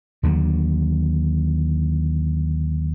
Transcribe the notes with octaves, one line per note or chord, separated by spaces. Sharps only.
D#2 D3 F#3